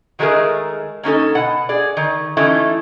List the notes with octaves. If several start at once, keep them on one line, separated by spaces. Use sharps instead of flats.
D#3 F#3 G#3 A3 G#4 A#4
A#3 C#4 D#4 A4
B2 F#5
G#4 D5
D#3
E3 A3 C#4 D#4 E4